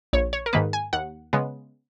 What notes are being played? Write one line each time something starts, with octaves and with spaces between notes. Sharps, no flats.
A#1 C#5
C#5
A#4
G#2 D#3 A#3 B4
G#5
D#2 F#5
C#3 G#3 B3